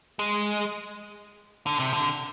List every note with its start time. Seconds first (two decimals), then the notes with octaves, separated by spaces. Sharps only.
0.19 G#3
1.66 D3
1.80 C3
1.94 D3